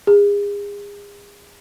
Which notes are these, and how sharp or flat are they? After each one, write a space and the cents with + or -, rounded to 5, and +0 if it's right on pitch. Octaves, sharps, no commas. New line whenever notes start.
G#4 -35